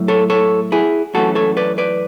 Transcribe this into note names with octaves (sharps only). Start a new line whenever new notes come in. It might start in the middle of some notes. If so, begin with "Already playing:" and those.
Already playing: A2 F#3
A4 C#5
A4 C#5
E4 G#4
F#2 E3 A3 C#4 F#4 A4
A4 C#5
B4 D5
B4 D5